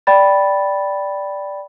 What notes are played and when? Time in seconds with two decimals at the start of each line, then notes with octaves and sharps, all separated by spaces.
0.07 D5 G5 B5 A6